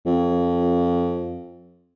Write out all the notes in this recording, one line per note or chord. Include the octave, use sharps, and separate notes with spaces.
F2